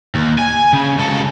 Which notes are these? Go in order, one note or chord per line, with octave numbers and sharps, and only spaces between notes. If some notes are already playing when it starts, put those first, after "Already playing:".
D#2
G#5
C#3
C#2 A4